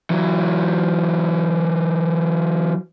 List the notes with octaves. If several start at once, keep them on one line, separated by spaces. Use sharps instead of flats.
E3 F#3